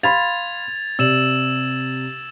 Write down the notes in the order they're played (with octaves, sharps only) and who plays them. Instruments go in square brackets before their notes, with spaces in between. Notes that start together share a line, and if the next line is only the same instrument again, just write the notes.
[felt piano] F5 B5 C6 [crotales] G#6 A6 F7
[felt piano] C3 D5 [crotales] E6 E7 F#7